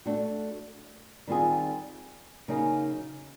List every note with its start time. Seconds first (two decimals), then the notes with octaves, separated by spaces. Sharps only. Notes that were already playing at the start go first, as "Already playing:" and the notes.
0.06 A3 D4 F#4
1.27 D#3 G3 C4 F4 G#4
2.48 C#3 F#3 A#3 D#4 G#4